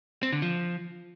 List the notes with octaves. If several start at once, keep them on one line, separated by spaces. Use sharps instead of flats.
C4
D3
F3